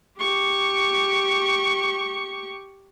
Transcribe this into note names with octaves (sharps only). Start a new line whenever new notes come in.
G4 C#6